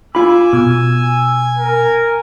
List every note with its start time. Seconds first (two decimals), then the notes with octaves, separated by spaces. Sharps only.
0.15 F4 G#5 B5 D6 E6
0.53 B2 G#5
1.58 A#4